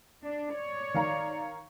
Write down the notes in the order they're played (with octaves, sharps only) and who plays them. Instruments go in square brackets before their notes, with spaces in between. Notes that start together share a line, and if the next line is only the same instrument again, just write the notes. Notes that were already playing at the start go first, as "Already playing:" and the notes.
[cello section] D4 [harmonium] D5
[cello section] C#5
[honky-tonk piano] D#3 F5 A#5